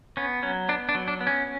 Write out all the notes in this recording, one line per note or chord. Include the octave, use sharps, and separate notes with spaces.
B3 C#4
F#3 C#4
B3 D4
D4
F#3
D4
B3
C#4